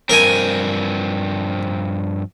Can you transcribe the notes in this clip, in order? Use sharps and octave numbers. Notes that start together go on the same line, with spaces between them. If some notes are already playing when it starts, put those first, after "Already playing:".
G2 F3 C4 A#4 G#5